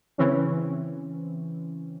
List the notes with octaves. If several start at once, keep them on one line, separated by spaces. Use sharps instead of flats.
C#3 E3 C4 C#4